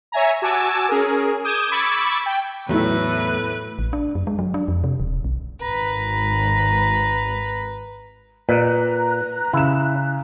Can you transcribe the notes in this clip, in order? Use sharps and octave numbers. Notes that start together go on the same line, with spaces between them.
C#5 E5 G#5 A#5
F#4 G#5 A5 D6 E6
C#4 G#4 A#4
D6 D#6 G6 G#6 D#7 E7
B5 C#6 D6 E6 G#6 A6
G5
E2 A2 F#3 A3 E4 B4
A1
D4
F#2
G#3
F#3
D4
F2
C3
D#1
B1
G#1 B4 A#5
A#2 B4 A#5 F#6
C#3 E4 E7